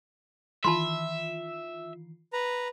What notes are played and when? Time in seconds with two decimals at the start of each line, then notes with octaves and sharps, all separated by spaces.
0.65 D#3 E3 F4 E5 A5 B5 C6
2.33 B4 A#5